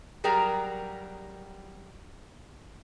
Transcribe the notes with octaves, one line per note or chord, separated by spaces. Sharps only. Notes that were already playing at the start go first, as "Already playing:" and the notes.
F#3 G3 G#4 A#4 G5 A#5